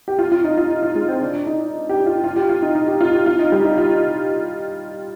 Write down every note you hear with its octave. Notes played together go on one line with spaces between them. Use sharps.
G4
F4
F4
D#4
F4
F4
G#3
C4
D4
D#4
G4
F4
F4
G4
F4
D#4
D#4
G4
F4
G4
F4
D#4
G3
D#4
F4